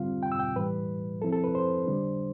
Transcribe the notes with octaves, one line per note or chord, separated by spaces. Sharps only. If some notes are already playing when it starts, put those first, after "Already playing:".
Already playing: D3 G3 C4 F4 F5
G5
E6
G5
A2 E3 G3 B4
F3 C4 E4 A4
A4
B4
C5
D3 G3 D4